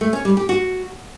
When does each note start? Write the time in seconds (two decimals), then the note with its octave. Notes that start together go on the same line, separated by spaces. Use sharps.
0.01 A3
0.13 C#4
0.25 G3
0.37 G4
0.49 F#4